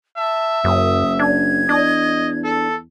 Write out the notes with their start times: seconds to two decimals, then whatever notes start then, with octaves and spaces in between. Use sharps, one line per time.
0.18 E5 A5
0.64 F#1 F#2 D#6
1.19 D4 G#6
1.69 E2 D4 D#5
2.44 A4